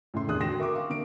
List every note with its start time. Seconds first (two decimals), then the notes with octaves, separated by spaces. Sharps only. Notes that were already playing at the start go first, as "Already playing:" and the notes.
0.14 A2 C#3 E5 C6
0.27 E1 D#2 D4 G#4 D#6 F#6
0.40 D2 F#4 G5 C6 A#6 E7
0.58 A#4 E5 C#6 D6
0.75 F5
0.90 D3 A#3 D7